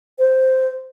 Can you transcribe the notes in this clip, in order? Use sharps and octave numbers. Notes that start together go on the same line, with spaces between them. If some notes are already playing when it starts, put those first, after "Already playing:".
C5